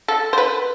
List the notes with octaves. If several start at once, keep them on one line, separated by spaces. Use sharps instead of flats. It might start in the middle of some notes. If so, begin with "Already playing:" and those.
A4
C5
B4